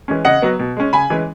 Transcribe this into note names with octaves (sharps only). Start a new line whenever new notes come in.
E3 G#3 C#4
C#3 D#5 F#5
F#3 B3
B2
G#3 C#4
C#3 G#5 B5
E3 G#3 C#4